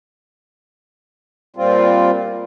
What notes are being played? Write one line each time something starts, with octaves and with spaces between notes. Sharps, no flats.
A#2 G3 C4 F4